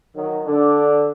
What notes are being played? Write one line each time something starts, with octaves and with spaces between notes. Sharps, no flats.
D#3 F#3
D3 D4